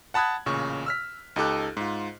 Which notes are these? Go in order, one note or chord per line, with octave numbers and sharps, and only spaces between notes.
F#5 A5 B5 D#6 F#6 G#6
A1 A#2 C#3 C#6
E6 F6 B6
C#2 D#4 G4 A4 D6 F#6
G#2 F4